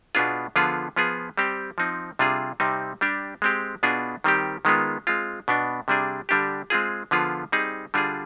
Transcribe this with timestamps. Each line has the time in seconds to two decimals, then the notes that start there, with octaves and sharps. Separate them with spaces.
0.15 B2 B3 D4 F4 G#4
0.56 D3 F3 B3 F4 G#4
0.96 F3 B3 F4 G#4
1.38 G3 C4 G4
1.78 F3 C4 D#4
2.19 C3 G3 D4 F4 G#4
2.60 C3 G3 C4 D#4
3.01 G3 D4 G4
3.42 G#3 C4 G4
3.83 B2 B3 D4 F4 G#4
4.24 D#3 G3 C4 G4
4.65 D#3 G#3 B3 F4
5.07 G#3 C4 F4
5.48 B2 B3 D4
5.88 C3 G3 D4 G#4
6.29 D3 G3 D4 G4
6.70 G#3 C4 F4 G#4
7.11 D3 F3 B3 F4 G#4
7.52 G3 C4 D#4 G#4
7.94 D3 G3 D4 F4 G#4